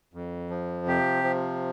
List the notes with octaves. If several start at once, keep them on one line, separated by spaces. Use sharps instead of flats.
F2
F3
C3 G4
F3